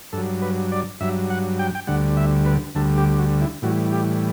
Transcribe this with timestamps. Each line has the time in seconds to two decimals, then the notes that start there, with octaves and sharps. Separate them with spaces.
0.13 G2 F#3 A4
0.42 B4
0.72 D5
1.01 G2 F#3 E5
1.30 F#5
1.59 G5
1.75 G5
1.87 D2 D3 G3 F#5
2.17 E5
2.45 B4
2.75 D2 D3 G3 A4
2.98 G4
3.19 F#4
3.41 E4
3.62 A2 E3 G3 F#4
3.92 G4